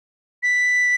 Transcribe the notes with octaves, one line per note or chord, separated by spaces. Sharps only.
B6